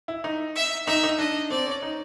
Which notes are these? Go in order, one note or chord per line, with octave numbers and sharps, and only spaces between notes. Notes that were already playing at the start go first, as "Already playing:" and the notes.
E4
D#4
E5
D#4 E5
D#4
D4 D#5
C4 D5
C#4
D#4